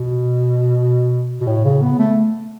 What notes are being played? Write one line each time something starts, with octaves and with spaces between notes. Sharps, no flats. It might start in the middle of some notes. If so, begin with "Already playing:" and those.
Already playing: B2
B2
A2
C#3
B3
A3